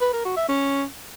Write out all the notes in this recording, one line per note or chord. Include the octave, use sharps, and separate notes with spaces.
B4
A#4
F#4
E5
C#4